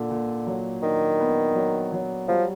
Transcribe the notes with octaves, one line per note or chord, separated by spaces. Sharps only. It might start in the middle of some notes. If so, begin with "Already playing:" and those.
Already playing: A#2 D3 D4
A#2
F#3
D#3 D4
B3
F#3
F#3
F3 G3